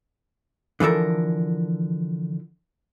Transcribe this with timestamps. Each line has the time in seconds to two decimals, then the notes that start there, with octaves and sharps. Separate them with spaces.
0.80 D3 E3 F3 A4 A#4